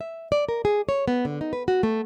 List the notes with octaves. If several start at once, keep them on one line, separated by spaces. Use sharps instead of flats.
E5
D5
A#4
G#4
C#5
B3
D3
D#4
B4
F#4
A3